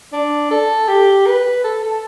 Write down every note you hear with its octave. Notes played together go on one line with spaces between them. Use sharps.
D4
A4
G4
B4
A4
A4